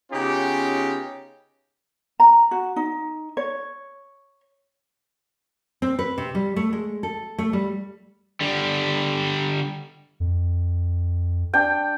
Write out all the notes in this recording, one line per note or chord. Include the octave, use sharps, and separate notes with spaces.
C#3 B3 C#4 D#4 F4 G4
A#5
F#4
D#4
C#5
C4
B4
C3
G3
A3
G#3
A4
A3
G3
D3 G3
F2
D4 G5